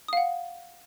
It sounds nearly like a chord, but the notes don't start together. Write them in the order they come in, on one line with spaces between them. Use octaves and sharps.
D#6 F5 F#5